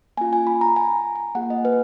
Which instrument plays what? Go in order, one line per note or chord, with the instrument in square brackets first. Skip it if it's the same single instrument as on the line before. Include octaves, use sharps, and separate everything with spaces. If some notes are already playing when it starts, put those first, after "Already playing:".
[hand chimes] A#3 C#4 F4 G#5
G#5
B5
A#5
G#5
G#5
A#3 F4 G#4 F#5
D#5
B4